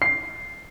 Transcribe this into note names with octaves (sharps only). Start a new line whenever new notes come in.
C7